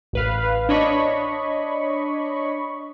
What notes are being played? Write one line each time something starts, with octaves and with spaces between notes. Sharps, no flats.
A1 B4 F5
D4 C#5 D#5 B5 C#6